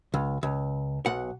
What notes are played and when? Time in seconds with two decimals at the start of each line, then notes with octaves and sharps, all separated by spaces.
0.14 C#2
0.43 C#2
1.06 B1 F#5